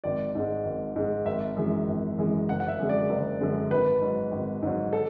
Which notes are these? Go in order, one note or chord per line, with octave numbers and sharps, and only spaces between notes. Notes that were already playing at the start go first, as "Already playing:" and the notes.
G#1 D5
G#2 G#3
G#1
G#2 G#3
G#1 E5
F#2 E3 G#3
G#1
F#2 E3 G#3
F#1 F#5
F#5
E5
F#2 D3 G#3
D5
F#1
F#2 D3 G#3
G#1 B4
G#2 F#3
G#1
G#2 F#3
A4